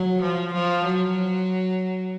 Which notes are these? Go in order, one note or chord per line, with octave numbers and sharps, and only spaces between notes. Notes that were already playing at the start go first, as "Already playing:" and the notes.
Already playing: F#3
F3
F3
F#3